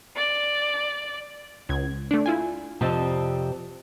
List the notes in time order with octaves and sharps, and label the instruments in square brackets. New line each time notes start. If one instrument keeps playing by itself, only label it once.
[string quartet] D5
[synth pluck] C#2 G#6
A3 D4
E4 F4 G#5
[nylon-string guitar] F2 C3 C4 D5 D#5 A5